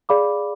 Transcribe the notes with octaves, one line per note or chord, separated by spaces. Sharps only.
G#4 D5 F5 B5 D6